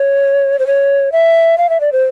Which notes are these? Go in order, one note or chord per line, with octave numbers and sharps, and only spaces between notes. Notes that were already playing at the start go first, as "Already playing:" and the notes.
Already playing: C#5
C5
C#5
E5
F5
E5
D5
C5